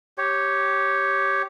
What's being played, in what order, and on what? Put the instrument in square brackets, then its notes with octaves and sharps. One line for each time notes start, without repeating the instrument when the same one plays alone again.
[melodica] G4 C#5